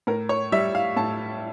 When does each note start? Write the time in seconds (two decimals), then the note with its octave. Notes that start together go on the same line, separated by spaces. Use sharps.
0.07 A2 A#4
0.29 C#5
0.52 G3 E5
0.75 F5
0.96 A2 A5